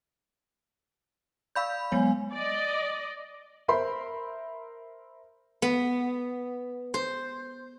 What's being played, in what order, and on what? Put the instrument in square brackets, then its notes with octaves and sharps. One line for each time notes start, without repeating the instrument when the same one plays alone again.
[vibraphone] D5 C#6 E6 [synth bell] F5 B5 G6
[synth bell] F#3 B3 C#5 [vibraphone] G#3 G#5
[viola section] D5 D#5
[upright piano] A#4 C5 E5 B5 C6
[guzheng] B3
C5